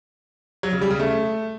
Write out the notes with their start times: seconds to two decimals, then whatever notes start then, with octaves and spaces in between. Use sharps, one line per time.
0.63 F#3
0.72 C#3
0.81 G3
0.90 C#3
0.99 A3